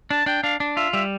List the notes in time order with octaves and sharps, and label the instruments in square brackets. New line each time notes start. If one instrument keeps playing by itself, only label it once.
[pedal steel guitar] D4 [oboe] A5
[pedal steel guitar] D4 [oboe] G5
[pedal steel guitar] D4 [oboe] F5
[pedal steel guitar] D4
[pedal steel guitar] F4 [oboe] E5
[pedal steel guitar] G3 [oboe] E5